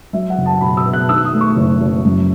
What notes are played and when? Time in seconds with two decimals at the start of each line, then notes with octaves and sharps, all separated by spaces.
0.13 F#3 E5
0.30 F#5
0.38 F#1
0.46 A5
0.61 B2 B5
0.77 E6
0.86 B2
0.93 F#6
1.09 D#3 E6
1.25 D#6
1.33 A3
1.41 C#6
1.56 F#1
1.81 F#1
2.05 F#2